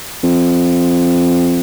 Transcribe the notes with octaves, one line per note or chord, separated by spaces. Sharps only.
F2